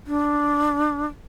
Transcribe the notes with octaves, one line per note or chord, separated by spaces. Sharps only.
D4